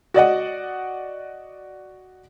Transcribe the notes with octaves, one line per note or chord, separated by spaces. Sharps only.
F#4 D5 D#5 F#5